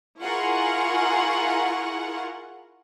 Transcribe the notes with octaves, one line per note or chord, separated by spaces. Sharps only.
E4 F4 G#4 A#4 F#5 C#6